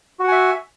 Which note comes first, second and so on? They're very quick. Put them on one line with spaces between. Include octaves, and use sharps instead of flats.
F#4 F#5 G#5 E5